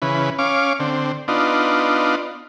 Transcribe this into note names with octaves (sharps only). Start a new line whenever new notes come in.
C#3 E3 B4
C#4 F5 D6
D3 C4
B3 D4 D#4 F4